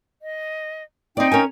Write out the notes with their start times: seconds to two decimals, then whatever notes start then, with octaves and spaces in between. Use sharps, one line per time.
0.21 D#5
1.17 C4 D#4 D5 G5
1.32 C#4 A#4 G#5